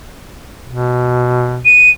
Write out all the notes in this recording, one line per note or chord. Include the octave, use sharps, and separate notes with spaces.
B2
D#7